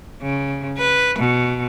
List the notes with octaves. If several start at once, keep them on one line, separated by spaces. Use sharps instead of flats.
C#3
B4
B2